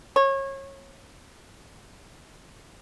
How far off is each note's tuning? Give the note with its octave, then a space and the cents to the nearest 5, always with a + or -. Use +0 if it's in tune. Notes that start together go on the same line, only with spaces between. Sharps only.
C#5 -25